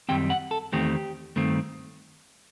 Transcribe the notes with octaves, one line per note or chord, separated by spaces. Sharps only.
F#2 D#3 G3 C4 G5
F#5
A4
E2 D#3 A3 C4 G4
G2 D#3 A3 C4